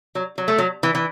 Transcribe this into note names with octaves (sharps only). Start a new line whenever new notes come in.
F#3
F#3
A3
F#3
E3
E3